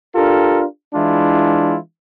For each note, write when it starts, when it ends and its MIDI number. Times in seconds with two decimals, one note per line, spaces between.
0.15 0.64 62
0.15 0.64 65
0.15 0.64 67
0.15 0.64 69
0.15 0.64 70
0.94 1.77 52
0.94 1.77 56
0.94 1.77 62
0.94 1.77 64
0.94 1.77 65